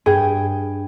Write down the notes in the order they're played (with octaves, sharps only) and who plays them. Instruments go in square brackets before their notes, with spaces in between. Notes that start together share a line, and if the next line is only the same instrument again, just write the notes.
[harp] G2 G5 G#6 [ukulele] G#4